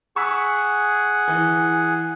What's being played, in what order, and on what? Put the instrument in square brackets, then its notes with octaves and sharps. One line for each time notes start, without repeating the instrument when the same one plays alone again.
[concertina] G#4 F#5 [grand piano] C#6 E6 B6
[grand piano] E3